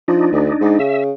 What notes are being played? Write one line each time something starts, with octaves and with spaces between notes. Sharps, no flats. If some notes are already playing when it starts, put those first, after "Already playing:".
F3 D4 D#4
D2
G#2
C#3 E5